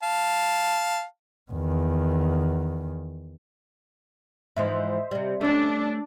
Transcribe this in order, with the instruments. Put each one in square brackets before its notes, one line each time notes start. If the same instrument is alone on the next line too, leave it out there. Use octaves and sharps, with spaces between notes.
[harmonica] F5 A5
[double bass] E2 D#3
[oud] G#2 E3 F3 [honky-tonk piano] C5 D#5 E5
[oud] C3 G3
[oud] A3 C#4 [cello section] D4